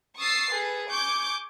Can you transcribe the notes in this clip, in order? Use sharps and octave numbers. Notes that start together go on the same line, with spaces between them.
C#6 D#6 E6 A6 C7
G#4 A4 B4
G#5 C#6 D6 G6